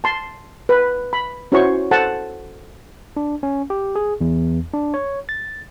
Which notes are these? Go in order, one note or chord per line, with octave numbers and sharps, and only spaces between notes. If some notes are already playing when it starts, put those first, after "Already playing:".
A5 C6
B4
B5
C#4 E4 F#4 C5 C#5 C#6
A4 C5 F#5 A5
D4
C#4
G4
G#4
E2
D4
C#5
A6